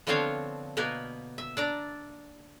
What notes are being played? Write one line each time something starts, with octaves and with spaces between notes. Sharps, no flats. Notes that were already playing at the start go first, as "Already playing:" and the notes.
D3 F3 B3 C4 C#5 F5
B2 A#3 B3 A#4 B4
E5
D4 D5 A#5